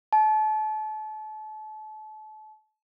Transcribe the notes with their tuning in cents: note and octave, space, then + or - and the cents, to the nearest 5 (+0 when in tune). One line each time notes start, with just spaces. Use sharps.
A5 -35